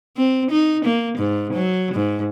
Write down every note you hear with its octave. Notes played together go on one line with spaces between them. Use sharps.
C4
D#4
A#3
G#2
F#3
G#2